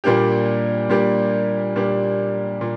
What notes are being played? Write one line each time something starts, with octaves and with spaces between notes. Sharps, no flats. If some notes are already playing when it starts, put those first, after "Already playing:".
A#2 G3 A#3 D4 G4
A#2 G3 A#3 D4 G4
A#2 G3 A#3 D4 G4
A#2